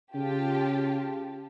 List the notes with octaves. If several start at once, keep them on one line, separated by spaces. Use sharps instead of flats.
C#3 F4 G4 A5